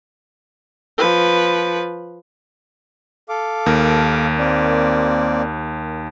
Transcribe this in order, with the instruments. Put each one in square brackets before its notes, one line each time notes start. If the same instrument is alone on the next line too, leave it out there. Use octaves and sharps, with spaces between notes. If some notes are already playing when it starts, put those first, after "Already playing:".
[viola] F3 B4
[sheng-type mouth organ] A4 F5 D6
[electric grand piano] D#2 A#4
[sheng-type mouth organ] A#3 C4 D5